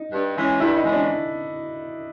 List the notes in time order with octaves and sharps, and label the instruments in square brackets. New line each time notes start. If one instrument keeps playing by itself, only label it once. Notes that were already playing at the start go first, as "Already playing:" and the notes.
Already playing: [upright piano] D#4
[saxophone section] G2
E3 G#3 C#4
[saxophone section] G2 [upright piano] E4
[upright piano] D#4
[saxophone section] E3 G#3 C#4
[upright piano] D4